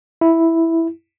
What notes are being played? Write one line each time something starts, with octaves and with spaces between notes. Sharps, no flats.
E4